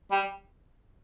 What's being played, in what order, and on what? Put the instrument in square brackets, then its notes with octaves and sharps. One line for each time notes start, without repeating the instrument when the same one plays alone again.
[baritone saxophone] G3